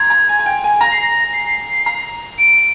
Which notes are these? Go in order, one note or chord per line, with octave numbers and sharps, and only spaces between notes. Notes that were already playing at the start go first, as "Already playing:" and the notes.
Already playing: A#5 C6 G#6
A#5
G#5
G#5
G5
G#5
A#5 A#6
C7
A#6
C7
A#5
D7